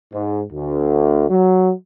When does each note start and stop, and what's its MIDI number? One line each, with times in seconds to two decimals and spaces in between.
0.13 0.43 44
0.52 1.27 38
1.30 1.70 54